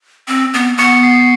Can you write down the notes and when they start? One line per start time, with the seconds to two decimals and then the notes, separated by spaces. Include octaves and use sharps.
0.28 C4
0.54 B3
0.78 B3 C#6 C#7
1.03 C7